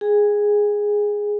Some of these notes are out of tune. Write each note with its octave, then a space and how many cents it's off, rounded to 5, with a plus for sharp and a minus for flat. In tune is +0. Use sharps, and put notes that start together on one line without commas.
G#4 +0 G#5 -35